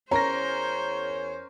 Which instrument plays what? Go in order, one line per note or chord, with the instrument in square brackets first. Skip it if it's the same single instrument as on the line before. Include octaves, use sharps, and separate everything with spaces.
[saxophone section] E2 C#5 [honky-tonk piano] C#4 A#4 A#6 [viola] C5 [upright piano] A#5